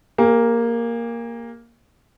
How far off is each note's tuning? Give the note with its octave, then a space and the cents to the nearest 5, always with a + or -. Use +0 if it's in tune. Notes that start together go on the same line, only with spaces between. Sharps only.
A#3 +0 G#4 -45